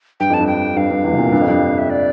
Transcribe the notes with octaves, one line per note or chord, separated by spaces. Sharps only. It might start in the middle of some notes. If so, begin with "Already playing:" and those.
G2 G5
F2 A5
G2
G5
G2 F5
G2
E2
C3
A#2
G2
F2
G2
E5
D5